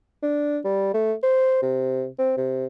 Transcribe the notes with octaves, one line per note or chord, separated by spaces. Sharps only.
D4
G3
A3
C5
C3
C4
C3